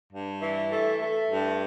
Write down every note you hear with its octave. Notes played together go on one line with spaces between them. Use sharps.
G2
E3
A3
A3
G2